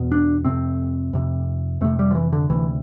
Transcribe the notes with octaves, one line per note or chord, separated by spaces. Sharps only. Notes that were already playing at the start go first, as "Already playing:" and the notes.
Already playing: E2 B2
D4
F2 C3 C4
F2 C3
F2 C3 A3
G3
F3
E3
D3
D2 C3 E3